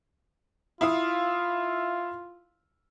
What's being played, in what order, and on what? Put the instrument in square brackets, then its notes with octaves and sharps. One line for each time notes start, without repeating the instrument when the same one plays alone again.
[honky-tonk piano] E4 F5 D#6 [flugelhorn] F4